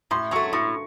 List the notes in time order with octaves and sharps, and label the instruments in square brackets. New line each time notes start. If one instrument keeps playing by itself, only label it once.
[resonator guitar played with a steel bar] A2 [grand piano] C6
[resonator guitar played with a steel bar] F#3 A3 [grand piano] C#6
[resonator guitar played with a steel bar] A2 [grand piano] C#6